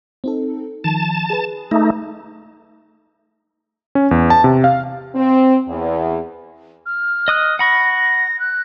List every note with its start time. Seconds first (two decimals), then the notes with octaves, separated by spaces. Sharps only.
0.24 C4 D#4 A4
0.84 D#3 F3 A5
1.30 G#4 B4
1.71 A3 D#4
3.95 C#4
4.11 E2
4.30 A5
4.44 C3
4.64 F5
5.14 C4
5.68 E2
6.86 F6
7.28 D#5 D#6 F#6
7.59 F#5 B5 C#6 A#6
8.39 F#6